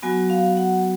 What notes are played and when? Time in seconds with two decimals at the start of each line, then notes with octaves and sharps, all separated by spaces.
0.02 F#3 B3 F#4 G#5
0.30 F5
0.57 F#5